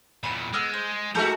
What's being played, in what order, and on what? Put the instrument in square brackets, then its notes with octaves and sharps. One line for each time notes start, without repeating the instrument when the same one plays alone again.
[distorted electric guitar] E2 A#2 [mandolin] B5 C#6
[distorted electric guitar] G#3 [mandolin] B3 E6 F6
[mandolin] C5
[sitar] G#3 A3 F#4 [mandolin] E4 G4 A#4 [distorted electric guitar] A#5